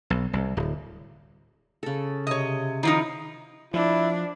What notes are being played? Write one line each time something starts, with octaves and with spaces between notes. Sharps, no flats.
B1
C2
D1
C#3 A4
C3 C#5 D#5
D#3 F3 D#4 E4
F3 D4 E4